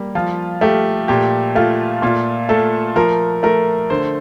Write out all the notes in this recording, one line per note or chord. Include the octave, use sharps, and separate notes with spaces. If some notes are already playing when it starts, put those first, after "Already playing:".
Already playing: G3 A#3
F3 F4
A3 G4
A#2 G4
A3 F4
A#2 F4
A3 A4
F3 A#4
A3 A#4
D3 C5